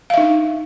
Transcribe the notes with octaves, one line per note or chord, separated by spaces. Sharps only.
D4 D#4 E5 F5